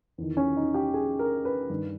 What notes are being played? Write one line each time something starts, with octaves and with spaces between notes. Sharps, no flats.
E2 D#3
C#4
D#4
G4
G#4
A#4
B4
G2 D#3